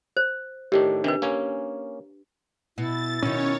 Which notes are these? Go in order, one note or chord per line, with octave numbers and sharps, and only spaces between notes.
C5
A2 D#3 D4 G4
C3 D#3 D4 B4
A#3 C#4 G#5
B2 E4 A6
B2 D#3 C#4 C#5